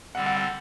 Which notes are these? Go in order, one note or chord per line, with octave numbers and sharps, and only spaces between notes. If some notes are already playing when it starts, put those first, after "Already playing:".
D3 G3 C4 F#5
F#5
F#5